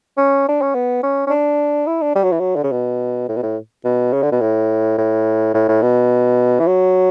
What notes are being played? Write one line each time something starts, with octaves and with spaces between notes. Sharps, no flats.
C#4
D4
C#4
B3
C#4
C#4
D4
E4
D4
G3
F#3
E3
F#3
D3
C#3
B2
A2
B2
A2
B2
C#3
D3
B2
A2
A2
A2
A2
B2
E3
F#3